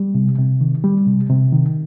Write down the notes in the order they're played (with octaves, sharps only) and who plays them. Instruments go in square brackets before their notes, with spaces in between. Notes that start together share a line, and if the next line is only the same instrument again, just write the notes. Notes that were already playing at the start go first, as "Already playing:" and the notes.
Already playing: [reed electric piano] G3
C3
C3
D#3
G3
C3
C3
D#3